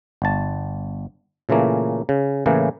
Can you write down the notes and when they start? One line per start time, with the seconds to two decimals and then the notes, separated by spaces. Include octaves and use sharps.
0.22 G1 A5
1.49 A#2 C#3 E3 A3 A#3
2.09 C#3
2.46 A2 C#3 E3 A#3